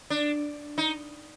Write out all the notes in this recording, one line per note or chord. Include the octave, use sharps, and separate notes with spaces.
D4
D#4